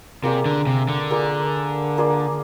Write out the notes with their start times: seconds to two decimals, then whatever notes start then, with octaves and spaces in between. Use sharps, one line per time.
0.24 C3 A#3 F4 G#4 D5
0.46 D3
0.67 C3
0.89 D3
1.10 A#3 F4 G#4 D5
1.97 A#3 F4 G#4 D5